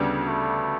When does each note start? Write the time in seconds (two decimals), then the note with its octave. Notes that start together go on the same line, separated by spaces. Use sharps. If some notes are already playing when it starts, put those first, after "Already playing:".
Already playing: D2 C#3 G3 B3 D4
0.28 A3